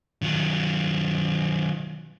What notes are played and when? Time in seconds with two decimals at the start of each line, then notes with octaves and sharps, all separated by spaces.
0.22 D#3 F#3